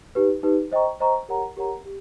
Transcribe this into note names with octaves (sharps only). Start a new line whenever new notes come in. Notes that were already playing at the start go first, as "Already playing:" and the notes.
D#4 G4 B4
D#4 G4 B4
C5 D#5 G5 A#5 C#6
C5 D#5 G5 A#5 C#6
G4 A#4 C#5 F#5 A#5
G4 A#4 C#5 F#5 A#5
G4